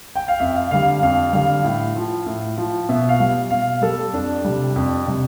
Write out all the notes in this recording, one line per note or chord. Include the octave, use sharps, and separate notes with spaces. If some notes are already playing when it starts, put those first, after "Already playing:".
G5
F5
F2 E5
F5
D3 G3 F5
F5
F2 F5
D3 G3 F5
A2
F3
A2
F3
B2 E5
F5
G3
B2 F5
G3 A4
F2 D4
C3 G3
F2
C3 G3